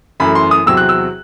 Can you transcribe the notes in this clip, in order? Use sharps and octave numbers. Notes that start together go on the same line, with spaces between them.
F#2 E3 A3 B5
C6
D#6
E2 C3 F#3 C4 E6
F#6
E6